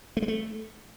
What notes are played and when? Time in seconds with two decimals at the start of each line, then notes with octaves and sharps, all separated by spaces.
0.17 A3
0.22 G#3
0.28 A3